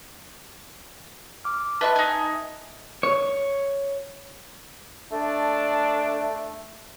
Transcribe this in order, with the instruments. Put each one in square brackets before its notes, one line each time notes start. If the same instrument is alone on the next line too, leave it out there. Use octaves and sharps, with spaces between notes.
[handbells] D6 F6
[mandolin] B4 C6 C#6 [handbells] D#5 E5 A5
[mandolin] D#4 G#5
[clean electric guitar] C#5
[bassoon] A3 [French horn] D4